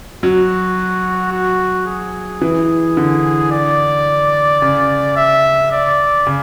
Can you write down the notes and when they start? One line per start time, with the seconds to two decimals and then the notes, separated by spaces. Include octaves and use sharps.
0.23 F#3 F#4
1.32 F#4
1.87 G#4
2.41 E3
2.97 D3
3.52 D5
4.62 C#3
5.16 E5
5.72 D5
6.27 C#3